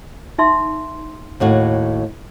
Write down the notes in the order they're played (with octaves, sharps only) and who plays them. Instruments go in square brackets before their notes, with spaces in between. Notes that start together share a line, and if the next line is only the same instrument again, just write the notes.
[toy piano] D#4 E5 C6
[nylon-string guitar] D#2 A2 F#4